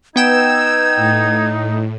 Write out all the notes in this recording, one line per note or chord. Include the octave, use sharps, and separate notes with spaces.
B3 D#4 G5 E6 G#6 E7
A2